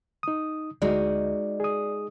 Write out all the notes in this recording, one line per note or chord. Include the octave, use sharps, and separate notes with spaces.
D#4 D#6
D2 G#3 D#4 F#4 D5
G#4 D#6